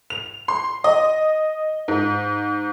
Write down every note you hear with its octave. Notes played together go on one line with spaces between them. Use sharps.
F7
C6
D#5
G#2